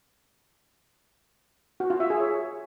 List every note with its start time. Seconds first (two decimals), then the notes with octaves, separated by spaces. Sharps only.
1.80 F#4
1.90 F4
2.00 E5
2.10 G#4
2.20 C#5